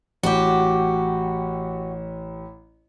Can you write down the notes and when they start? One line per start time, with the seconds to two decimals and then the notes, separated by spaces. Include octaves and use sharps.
0.23 A1 F#4 G4